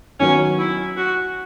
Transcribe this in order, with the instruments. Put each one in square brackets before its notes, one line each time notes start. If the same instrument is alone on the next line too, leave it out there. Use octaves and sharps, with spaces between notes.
[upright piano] D#3 F#3 B3 F#4 [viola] C#4
[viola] E4
F#4